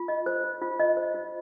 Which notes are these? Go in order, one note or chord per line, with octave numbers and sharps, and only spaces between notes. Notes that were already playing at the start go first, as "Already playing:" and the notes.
Already playing: F4
D#5
C5
F4
F4
D#5
C5
F4